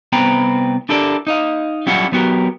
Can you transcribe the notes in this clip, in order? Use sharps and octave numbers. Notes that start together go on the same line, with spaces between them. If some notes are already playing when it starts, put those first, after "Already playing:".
C2 B3 C4 B4 G5 A#5
D4 E4 G4 A4 A#4 D5
D#4 D#5 F5
F#3 G3 C#4 E4 F4 F#5
F#3 B3 F#4 G4 A#4